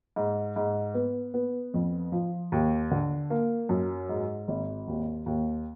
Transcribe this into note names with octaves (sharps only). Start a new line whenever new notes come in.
G#2
G#2
B3
B3
F2
F3
D#2
D3
A#3
F#2
G#2
G#1
D#2
D#2